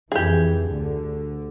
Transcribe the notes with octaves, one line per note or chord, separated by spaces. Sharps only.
F2 E3 G4 G#4
D2 D3